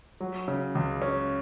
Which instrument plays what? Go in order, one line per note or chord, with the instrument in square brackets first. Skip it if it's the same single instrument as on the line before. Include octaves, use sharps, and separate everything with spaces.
[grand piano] F#3
C#3
C#2
C#4